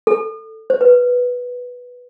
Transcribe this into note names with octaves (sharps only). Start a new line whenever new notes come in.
A4
C5
B4